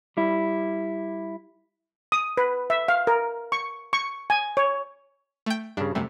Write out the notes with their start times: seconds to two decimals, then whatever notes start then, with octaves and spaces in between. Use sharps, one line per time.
0.17 G3 E4
2.12 D#6
2.37 B4
2.70 E5
2.88 F5
3.07 A#4
3.52 C#6
3.93 C#6
4.30 G#5
4.57 C#5
5.46 A3 G5
5.77 G2 C#3 D4
5.95 F#2 C3 G3 A3